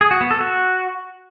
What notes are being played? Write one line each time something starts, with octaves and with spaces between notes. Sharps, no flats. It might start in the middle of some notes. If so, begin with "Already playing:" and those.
G#4
F#4
B3
A4
F#4